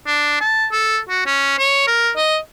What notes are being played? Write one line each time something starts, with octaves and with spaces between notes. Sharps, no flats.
D4
A5
A4
F#4
C#4
C#5
A#4
D#5